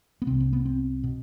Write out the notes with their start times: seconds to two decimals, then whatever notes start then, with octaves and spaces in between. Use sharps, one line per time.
0.22 B3
0.27 C2 C3 C4
0.40 C4
0.53 B3
0.65 C4
1.04 B2